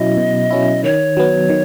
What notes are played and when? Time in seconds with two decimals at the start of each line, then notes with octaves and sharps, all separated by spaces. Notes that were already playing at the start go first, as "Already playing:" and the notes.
Already playing: B2 F#3 C#4 E4 D#5
0.17 B2
0.51 F#3 C#4 E4
0.84 D#3 C#5
1.17 F#3 B3
1.49 D#3